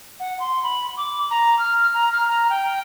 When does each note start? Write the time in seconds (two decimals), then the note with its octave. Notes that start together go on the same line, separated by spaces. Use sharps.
0.20 F#5
0.40 C6
0.63 B5
0.97 D6
1.31 A#5
1.59 F6
1.94 A#5
2.13 F6
2.29 A#5
2.50 G5